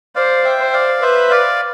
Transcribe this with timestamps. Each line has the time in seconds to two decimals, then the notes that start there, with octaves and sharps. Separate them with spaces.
0.15 C5 D5 F5
0.45 E5 G5
0.59 C5
0.73 D5 F5
1.01 B4 C5 E5
1.31 D5 F5